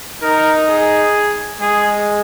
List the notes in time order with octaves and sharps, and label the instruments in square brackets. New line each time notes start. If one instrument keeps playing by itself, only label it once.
[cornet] D#4 [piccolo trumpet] A#4
[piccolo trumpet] G#4
[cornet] G#3 [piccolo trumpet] G#4